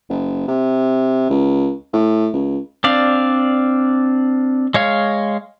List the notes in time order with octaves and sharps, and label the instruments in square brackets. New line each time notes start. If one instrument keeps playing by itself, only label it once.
[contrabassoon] F#1
C3
C#2
A2
C#2
[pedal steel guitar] C4 D4 D5 F5
G#3 C#5 F5